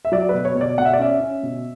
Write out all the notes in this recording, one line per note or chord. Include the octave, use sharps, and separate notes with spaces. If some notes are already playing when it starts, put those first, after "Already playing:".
E5
F#3 D5
B2 B4
C#5
B2
D5
B2 F#5
E5
D5
C#4 E5
C#4
B2